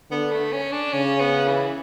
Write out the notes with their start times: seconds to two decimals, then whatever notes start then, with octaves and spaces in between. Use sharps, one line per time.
0.11 D3 B3
0.32 A3
0.52 C#4
0.72 D4
0.93 C#3 C#4
1.21 B3
1.48 E3